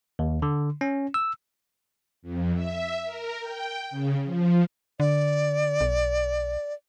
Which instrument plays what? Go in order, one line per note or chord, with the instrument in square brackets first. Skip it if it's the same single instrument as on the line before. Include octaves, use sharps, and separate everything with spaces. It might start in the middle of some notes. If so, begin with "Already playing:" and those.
[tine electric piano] D#2
D3
C#4
E6
[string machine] F2
E5
A#4
G5
C#3
F3
[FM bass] D3 [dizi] D5
[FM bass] B1